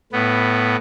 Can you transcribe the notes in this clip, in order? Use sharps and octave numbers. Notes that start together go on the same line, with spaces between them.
A2 B3